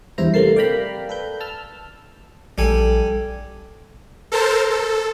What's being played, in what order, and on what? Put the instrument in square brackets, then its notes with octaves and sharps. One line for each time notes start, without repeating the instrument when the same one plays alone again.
[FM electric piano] E2 G2 E4 C5 A#5
C3 A3 A#3 A#4 A5 C7
D5 F5 G5 A#5 B5
A4 B4 G6
A5 E6 F6
[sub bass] A#1 [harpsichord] G3 A4 G#5
[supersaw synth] A4 A#4 C5 A5
A4